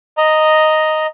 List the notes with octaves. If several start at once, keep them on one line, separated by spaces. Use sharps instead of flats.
D#5 A#5